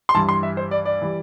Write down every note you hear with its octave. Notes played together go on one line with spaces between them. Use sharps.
C6
G2 E3 G3 A5
C6
E5
C5
D5
D5
E3 G3